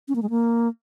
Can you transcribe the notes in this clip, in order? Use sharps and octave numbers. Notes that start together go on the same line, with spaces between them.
C#4
A#3
G#3
A#3